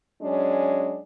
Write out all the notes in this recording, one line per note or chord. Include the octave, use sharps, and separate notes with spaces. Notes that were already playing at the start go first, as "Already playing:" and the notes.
F#3 G#3 C#4 D4